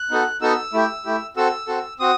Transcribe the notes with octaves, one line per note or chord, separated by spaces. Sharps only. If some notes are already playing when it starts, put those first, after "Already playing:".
Already playing: F#6
B3 D#4 F#4 A4
B3 D#4 F#4 A4 E6
A3 E4 G4
A3 E4 G4
C4 F#4 A4 E6
C4 F#4 A4
C4 F#4 D#6